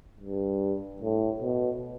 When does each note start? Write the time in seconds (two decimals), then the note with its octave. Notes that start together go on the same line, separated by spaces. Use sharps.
0.20 G2
1.02 A2
1.42 B2